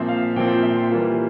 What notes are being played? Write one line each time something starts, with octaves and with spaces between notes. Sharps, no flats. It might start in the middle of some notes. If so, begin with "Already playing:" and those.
Already playing: A#2 F3 C4 E5
F5
A#2 F3 C4 G5
G5
E5
C6
E3 G3 A#3 F4